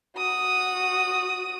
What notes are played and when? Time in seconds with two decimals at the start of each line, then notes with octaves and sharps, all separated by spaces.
0.17 F#4 D#6